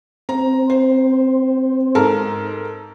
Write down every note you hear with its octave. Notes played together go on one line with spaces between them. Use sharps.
C4 A#5
C5
G#2 A4 A#4